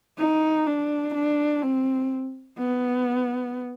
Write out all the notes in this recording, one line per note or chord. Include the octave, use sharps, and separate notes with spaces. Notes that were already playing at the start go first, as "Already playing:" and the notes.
D#4
D4
D4
C4
B3